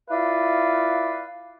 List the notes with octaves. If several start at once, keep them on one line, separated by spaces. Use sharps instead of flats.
E4 F4 B4 D5 F5